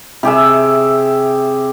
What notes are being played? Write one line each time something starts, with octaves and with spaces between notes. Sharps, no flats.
C3 G4 G#4 E5